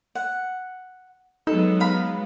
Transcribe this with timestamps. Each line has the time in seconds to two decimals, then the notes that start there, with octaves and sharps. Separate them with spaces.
0.15 F#5
1.47 F#3 G#3 B3 D#4 A4
1.80 F5 A#5 B5